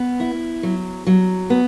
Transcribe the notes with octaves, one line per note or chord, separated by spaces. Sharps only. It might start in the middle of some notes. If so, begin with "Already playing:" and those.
Already playing: B3
E4
F#3
F#3
B3